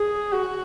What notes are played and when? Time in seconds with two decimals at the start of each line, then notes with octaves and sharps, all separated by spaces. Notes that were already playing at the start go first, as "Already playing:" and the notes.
Already playing: G#4
0.32 F#4